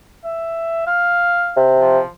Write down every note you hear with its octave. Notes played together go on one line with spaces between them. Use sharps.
E5
F5
C3
F3